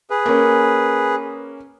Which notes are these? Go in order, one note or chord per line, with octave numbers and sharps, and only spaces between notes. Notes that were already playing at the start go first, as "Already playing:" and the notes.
G#4 B4
A#3 C#4